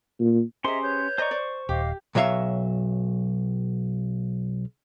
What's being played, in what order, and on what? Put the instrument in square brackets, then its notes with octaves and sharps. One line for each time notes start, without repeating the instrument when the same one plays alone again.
[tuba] A#2
[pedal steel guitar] C#4 G4 C6 [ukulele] G#4 C5 [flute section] D#5 E5 A#5
[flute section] B4 C#5 G6
[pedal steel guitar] C5 C#6 [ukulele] D5 D#5 A#5
[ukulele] D5
[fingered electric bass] D#1 [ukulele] G4 [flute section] D#5 F5 D6
[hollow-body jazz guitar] B1 F#3 C#5 E5 F5